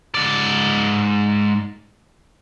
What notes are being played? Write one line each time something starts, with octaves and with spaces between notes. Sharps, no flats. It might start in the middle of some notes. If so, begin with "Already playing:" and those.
G#2 D5